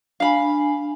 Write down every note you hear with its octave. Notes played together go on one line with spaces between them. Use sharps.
D4 F5 G#5 B5